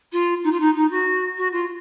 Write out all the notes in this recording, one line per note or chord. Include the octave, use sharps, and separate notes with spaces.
F4
D#4
F4
D#4
D#4
F#4
F#4
F4